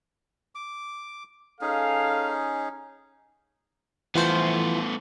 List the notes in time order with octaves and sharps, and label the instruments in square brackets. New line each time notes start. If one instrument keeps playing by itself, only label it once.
[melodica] D6
[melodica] C#4 D#4 G#4 [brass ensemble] A4 F5
[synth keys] E3 F3 C5 [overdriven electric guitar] A3 B3